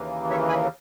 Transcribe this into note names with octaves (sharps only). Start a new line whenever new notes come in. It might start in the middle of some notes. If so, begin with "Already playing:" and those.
Already playing: D#2 C#3 E3 A#3
C#5 E5
G#5 B5